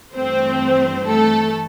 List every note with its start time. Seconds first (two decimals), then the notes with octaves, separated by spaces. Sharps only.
0.15 G2 E3 A3 C4 C5
1.05 A3 A4